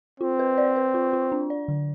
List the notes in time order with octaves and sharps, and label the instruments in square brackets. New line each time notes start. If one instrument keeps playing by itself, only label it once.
[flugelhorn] C4 [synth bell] F4
[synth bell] B4
D5
B4
F4
F4
D4
D5
D3